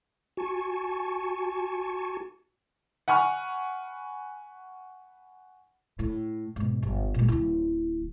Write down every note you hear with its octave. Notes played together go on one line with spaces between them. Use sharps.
F#4 G#5 A5 C#6
F#5 G#5 B5 C#6 F6
A2
G#2 B2
G1
A#2 G#3
D1 E4